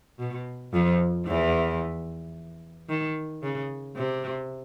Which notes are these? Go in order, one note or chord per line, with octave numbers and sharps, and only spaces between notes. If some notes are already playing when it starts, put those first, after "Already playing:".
B2
F2 F3
E2 E3
D#3
C#3
C3